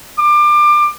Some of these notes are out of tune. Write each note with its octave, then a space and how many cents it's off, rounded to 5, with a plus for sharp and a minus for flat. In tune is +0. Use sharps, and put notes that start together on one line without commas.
D6 +25